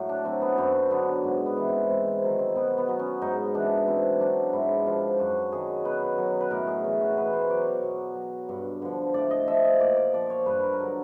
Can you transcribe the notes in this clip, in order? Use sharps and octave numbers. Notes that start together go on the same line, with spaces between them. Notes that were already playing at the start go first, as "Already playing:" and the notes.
Already playing: A2 F#3
D4
F#3 C4
B3
F#2 C4
D3 F#3 B3
G#2
B3
E3
C4
G#2 C4
C4
D#3 F#3 C4
C4
B2 B3
B3
F#3
C#4
G#2 D#4
E3 D4
B2 C4
F#3 D4
G#2 E4
F3 F4
F#2 F#4
D#3 F#3 G#4
B2 B4
F#3
B4
A2 A#4
G#4
E3
F#4
B2 B4
C5
F#3 D5
C#5
B2
F#3
G2
D3 F3
A2 D5
D#5
F3 E5
D#5
A#2 D5
D5
F3 D5
C#5
G2 B4
A#4
A#4
D3 F#3 A4